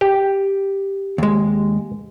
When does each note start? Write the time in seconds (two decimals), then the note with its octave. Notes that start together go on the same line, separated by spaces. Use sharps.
0.01 G4
1.18 D#2 G#3